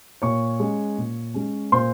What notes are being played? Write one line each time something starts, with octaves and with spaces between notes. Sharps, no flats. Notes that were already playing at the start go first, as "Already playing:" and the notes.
A#2 C#5 C#6
G#3 C#4
A#2
G#3 C#4
A#2 C5 C6